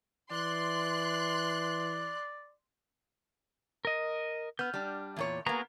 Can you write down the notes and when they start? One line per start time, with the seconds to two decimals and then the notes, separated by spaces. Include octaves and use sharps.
0.31 E3 D5 C6 F#6
3.85 A#4 D#5
4.59 B3 F6 G6
4.74 G3 D4
5.16 E2 A#2 C#5
5.46 A#3 B3 F#4 G#4 A#5